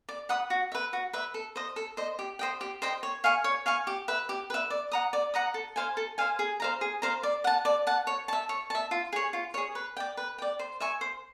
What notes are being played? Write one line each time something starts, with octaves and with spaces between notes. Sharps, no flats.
D5
F#5 B5 D#6
F#4
B4 E5
F#4
B4 E5
A4
C5 D#5
A4
C5 D#5
G4
C5 D#5 G5
G4
C5 D#5 G5
C#5
F5 G#5 C#6
C#5
F5 G#5 C#6
G4
B4 E5
G4
B4 E5
D5
F#5 A#5 D#6
D5
F#5 A#5 D#6
A4
C5 F5 G#5
A4
C5 F5 G#5
G#4
C5 F5 A#5
G#4
C5 F5 A#5
D5
F#5 A5
D5
F#5 A5
C#5
E5 A5
C#5
E5 A5
F4
G#4 C#5
F4
G#4 C#5
B4
D5 G5
B4
D5 G5
C5
E5 G#5 C#6
C5